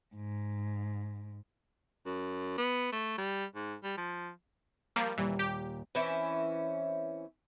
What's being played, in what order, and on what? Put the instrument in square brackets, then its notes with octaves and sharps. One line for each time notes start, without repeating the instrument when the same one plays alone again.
[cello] G#2
[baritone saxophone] F#2
B3
A3
G3
G#2
G3
F3
[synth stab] F3 G3 A#3
[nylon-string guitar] D#2 A#2 G3 [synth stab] E3
[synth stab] G4
[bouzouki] E3 C4 C#4 E5